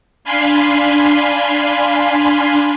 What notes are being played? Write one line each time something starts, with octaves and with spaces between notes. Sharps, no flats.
D4 F5 G#5 B5 C6